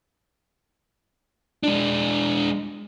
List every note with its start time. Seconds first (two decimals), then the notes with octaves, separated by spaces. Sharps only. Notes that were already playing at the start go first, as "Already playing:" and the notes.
1.63 G#3 D4